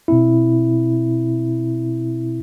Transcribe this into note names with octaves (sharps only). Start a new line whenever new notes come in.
B2 C4 E4